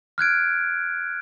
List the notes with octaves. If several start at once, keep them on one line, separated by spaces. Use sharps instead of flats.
F6 F#6 G#6 D7